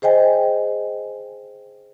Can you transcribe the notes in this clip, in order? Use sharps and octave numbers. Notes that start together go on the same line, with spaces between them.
G#4 C5 D#5 G5 G#5